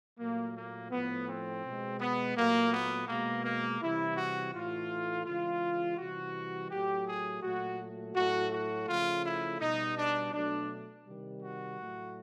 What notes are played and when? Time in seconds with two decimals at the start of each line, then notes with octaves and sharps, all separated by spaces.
0.19 A#2 F#3 A3 A#3
0.56 A#3
0.91 A2 F3 A3 B3
1.28 C4
1.64 B2 G#3
2.00 B3
2.36 A#2 F#3 A3 A#3
2.73 B3
3.08 B2 G#3 A#3
3.44 A#3
3.81 C3 E3 G3 E4
4.17 F#4
4.53 A2 E3 A3 F4
5.25 C#3 E3 G#3 F4
5.98 C3 E3 G3 F#4
6.71 A2 F#3 A3 G4
7.07 G#4
7.43 A#2 F#3 A3 F#4
8.15 A2 F#3 A3 F#4
8.52 F#4
8.87 C#3 F3 A3 F4
9.24 E4
9.61 B2 G3 D#4
9.97 D4
10.32 B2 F#3 A3 D4
11.06 C3 D#3 G3
11.42 F#4
11.78 A2 F#3 A3